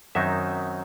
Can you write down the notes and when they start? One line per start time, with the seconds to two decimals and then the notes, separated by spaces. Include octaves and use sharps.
0.15 F#2 D#3 F#3 C4 D#4 E5